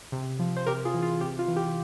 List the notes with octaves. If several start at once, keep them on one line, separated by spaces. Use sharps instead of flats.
C3
F3
C5
C3 G4 A#4
F4 G#4
E3
F4
C3 G4
F4
E3
G4